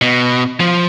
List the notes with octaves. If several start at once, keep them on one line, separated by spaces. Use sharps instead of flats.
B2
F3